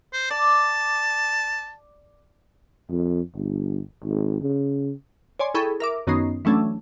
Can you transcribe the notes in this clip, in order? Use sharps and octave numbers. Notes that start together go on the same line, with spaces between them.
C5
D5 A5
F2
G1
G#1
C#3
C#5 D5 G#5 C6
E4 G#4 A4 G5 B5 C#6
A#4 E5 D6
F#2 D#3 B3 C#4 D#4 C7
E3 F#3 A3 C#4 D4